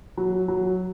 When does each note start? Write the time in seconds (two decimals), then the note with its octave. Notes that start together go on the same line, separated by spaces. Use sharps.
0.17 F#3
0.48 F#3